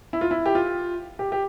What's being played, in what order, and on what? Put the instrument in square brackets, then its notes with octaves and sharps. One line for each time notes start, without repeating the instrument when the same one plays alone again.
[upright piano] E4
F4
E4
G4
F4
G4
G4